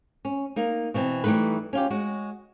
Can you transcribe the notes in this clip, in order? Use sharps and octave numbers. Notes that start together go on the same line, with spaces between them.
C#4
A#3 D#4
B2 E3 C4
E3 G3 A3 D#4 B4
C#4 F4 G4
G#3 F#4